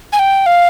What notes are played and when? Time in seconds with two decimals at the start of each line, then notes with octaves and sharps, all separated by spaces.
0.13 G#5
0.19 G5
0.46 F5